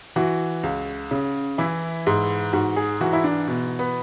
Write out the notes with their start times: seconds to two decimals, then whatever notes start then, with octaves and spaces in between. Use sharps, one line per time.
0.16 E3 F#4
0.63 C#2
1.11 C#3
1.58 E3 E4
2.07 G#2
2.53 G#2 F#4
2.76 G#4
3.01 E3 F#4
3.13 E4
3.24 D4
3.48 B2
3.79 B3